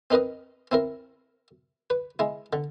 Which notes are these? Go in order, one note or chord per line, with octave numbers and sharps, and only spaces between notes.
C4 D#4 A#4 B4 D#5
C4 E4 A#4
B4
G#3 E4
D3